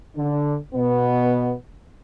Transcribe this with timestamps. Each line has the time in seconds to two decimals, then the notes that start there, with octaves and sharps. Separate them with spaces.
0.17 D3 D4
0.74 B2 B3